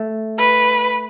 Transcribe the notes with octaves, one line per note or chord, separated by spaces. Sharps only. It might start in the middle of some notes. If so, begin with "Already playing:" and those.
Already playing: A3
B4